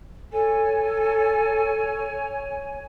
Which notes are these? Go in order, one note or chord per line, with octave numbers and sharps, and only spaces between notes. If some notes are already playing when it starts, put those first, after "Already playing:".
A4 C#5 G#5